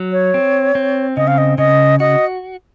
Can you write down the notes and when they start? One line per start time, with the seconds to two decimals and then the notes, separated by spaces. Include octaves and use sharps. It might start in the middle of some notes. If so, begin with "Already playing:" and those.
Already playing: F#3
0.12 C#5
0.34 C4
0.75 C4
1.17 C#3 D#5
1.28 F5
1.38 D#5
1.58 C#3 D#5
2.00 F#4 D#5